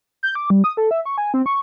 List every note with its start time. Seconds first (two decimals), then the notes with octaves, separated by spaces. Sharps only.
0.23 G6
0.35 D6
0.50 G3
0.64 D#6
0.77 A4
0.91 E5
1.06 C#6
1.18 G#5
1.34 C4
1.46 C#6